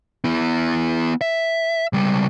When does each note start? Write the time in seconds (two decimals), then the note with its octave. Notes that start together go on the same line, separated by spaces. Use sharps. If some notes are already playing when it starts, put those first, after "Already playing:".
0.24 B3 E4
1.21 E5
1.93 C#2 G3